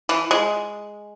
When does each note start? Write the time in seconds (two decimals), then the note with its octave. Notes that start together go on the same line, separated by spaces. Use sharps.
0.09 E3
0.31 G#3